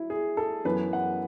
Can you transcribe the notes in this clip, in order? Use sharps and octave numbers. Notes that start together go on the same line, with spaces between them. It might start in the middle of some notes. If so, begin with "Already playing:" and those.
Already playing: F#3 E4
G#4
A4
F#2 E3 B3 B4
F#5